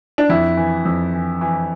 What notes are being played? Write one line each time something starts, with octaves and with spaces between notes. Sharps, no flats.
D4
F2 E4
E3
F2
E3
E3